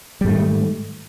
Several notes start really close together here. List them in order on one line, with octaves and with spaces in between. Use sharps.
G3 G#2 A3 D#3